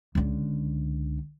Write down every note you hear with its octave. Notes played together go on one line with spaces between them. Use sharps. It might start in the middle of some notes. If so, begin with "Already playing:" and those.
C#2 D3